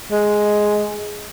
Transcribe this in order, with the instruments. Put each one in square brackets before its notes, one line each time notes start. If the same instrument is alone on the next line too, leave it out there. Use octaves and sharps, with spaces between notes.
[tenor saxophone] G#3